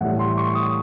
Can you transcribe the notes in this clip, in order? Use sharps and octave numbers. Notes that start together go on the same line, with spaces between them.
A2 E3 G3 F#5
C6
C#6
D#6